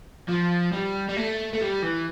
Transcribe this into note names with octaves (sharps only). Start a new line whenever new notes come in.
F3
G3
G3
A3
A3
G3
E3